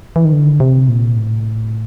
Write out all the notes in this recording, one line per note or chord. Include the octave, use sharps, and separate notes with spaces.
E3
D#3
D3
C3
A#2
A2